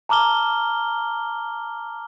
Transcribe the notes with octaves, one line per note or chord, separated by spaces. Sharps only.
A5 A#5 D6 F6 G7